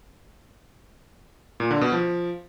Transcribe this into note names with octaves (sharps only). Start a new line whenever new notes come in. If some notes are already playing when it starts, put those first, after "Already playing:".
A#2
D3
B2
F3